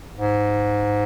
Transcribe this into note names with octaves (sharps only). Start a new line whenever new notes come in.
G#2